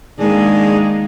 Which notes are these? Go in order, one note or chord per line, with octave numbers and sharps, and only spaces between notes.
D#3 G#3 A#3 D4 G#4